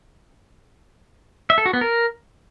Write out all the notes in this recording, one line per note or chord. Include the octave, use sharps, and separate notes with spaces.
E5
A4
F#4
B3
A#4